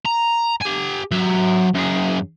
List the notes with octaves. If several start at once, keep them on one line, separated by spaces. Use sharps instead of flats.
A#5
G4 G#5
F#3 E5
F#2 G#4